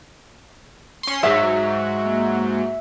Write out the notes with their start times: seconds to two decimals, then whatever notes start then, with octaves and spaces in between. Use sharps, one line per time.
1.03 C#4 C6
1.23 G#2 F#3 E5
2.05 A#3